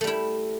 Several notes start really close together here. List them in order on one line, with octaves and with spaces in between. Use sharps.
A3 G3 E4